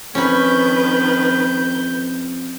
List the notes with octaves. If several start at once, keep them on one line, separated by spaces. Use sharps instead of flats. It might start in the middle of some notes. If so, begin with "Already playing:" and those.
F2 D#3 C#4 B4 B5 G6